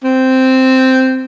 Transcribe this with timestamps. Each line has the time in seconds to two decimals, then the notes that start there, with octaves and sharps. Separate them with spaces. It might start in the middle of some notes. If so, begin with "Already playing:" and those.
0.04 C4